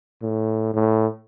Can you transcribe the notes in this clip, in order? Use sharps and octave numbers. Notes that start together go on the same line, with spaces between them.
A2
A2